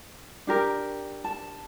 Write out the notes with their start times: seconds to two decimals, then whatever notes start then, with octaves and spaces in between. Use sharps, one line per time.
0.47 D4 G4 A#4
1.24 A5